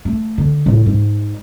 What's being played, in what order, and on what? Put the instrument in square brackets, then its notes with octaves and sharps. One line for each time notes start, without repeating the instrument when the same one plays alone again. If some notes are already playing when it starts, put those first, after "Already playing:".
[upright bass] A3
D3
A2
G#2